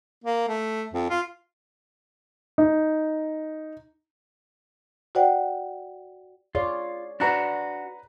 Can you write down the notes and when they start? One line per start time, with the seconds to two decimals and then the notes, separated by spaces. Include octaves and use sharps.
0.24 A#3
0.48 A3
0.93 F2
1.10 F4
2.58 D#4
5.15 F#4 C5 D5 F#5 G5
6.55 F4 G#4 C#5 D5
7.20 D4 F#4 B4 A#5 F#6